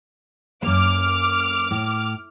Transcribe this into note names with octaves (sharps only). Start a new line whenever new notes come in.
F#2 A#3 D6 F6
A2